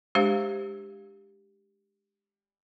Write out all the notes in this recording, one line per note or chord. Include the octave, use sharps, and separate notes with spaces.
G#3 D4 G4 C5 F5